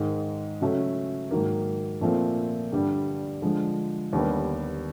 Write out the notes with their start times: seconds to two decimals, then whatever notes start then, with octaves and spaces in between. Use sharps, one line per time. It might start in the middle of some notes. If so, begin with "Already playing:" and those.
Already playing: G#2 D#3 G#3
0.61 C#3 F#3 A3 C#4
1.31 G#2 D#3 F#3 A#3
2.01 A#2 F3 A3 C4 F4
2.72 G2 D3 G3
3.42 D3 F3 G#3
4.13 D#2 D3 G3 B3